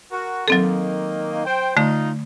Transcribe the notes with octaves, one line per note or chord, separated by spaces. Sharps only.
F#4 A#4
D#3 F#3 A#3 C4 A4
C5 G5
D3 A3 D#4 F4